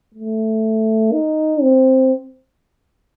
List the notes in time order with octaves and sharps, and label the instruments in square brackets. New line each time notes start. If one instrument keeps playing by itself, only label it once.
[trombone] A3
D#4
C4